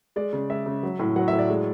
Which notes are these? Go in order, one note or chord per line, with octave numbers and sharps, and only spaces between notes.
G#3 D5
C#3
G#3 E5
C#3
F#3
A2
F#3 F#5
E5
A2
D5
G#3